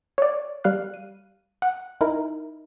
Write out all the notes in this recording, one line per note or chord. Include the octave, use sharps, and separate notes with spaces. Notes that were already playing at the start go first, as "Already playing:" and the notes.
C#5 D5
G3 F5 F#6
D#7
F#5
D#4 E4 A#4